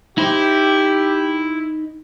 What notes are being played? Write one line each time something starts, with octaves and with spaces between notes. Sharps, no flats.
D#4 E4 G4 C5